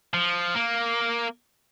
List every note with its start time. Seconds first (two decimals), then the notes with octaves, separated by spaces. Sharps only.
0.14 F3
0.55 A#3